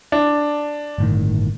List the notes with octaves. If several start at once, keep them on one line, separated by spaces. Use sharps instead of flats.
D4
G1 A2 D#3